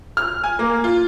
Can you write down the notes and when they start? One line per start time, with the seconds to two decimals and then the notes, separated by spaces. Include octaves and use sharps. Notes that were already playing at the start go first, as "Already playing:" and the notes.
0.17 F6
0.44 G#5
0.59 A#3
0.84 F4